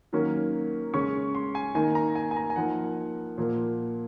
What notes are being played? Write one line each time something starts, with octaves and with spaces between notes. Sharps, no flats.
D#3 F#3 A#3 C#4
C#3 G#3 C#4 C#6
C6
G#5
D#3 A#3 D#4 G#5
A#5
G#5
G#5
A#5
G#5
F3 A#3 D#4 F#5
A#2 F3 A#3